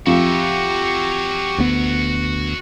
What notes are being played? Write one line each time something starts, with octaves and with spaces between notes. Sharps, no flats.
F2 F#4 G4 E5 C#6
D2 B3